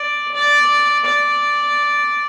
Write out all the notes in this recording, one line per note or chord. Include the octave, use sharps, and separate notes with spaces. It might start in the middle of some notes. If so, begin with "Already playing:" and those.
Already playing: D5
D5
D5